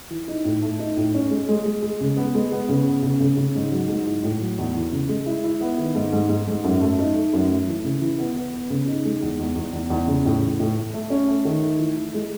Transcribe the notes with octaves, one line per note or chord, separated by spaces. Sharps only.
E3
D#4
A2
A3
D#4
A2
C#4
G#3
G#3
G#3
G#3
C#3
B3
G#3
B3
C#3
B3
C#3
C#3
C#3
G#2
F#3
G#2
E4
A2
F#3
E2
E3
C#3
G#3
E4
E4
B3
D#3
G#2
G#2
G#2
G#2
F#2
A3
D#4
A3
F#2
A3
E3
C#3
E3
B3
B3
B3
C#3
D#4
G#3
E2
E2
E2
E2
E2
C#3
A2
E3
A2
A3
A3
C#4
A3
D#3
A3
E3
E3
G#3